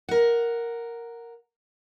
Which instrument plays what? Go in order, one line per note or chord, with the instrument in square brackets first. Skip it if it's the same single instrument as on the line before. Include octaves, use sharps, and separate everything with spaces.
[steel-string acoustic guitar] A#4 F#5